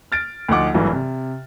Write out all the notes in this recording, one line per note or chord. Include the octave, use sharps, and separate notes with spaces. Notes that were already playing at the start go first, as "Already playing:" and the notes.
F6 A6 D7
D2 F3 D#4 F#5 D6
G#1 G2 E3 F#3 A3 A4
C3